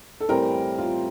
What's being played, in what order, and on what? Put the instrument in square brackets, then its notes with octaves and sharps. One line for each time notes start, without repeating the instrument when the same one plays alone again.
[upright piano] A4
[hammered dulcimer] A2 E3 G3 C4 [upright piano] A#4
[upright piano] F4